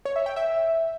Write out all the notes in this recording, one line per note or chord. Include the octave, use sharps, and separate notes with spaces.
C#5
E5
G5
E5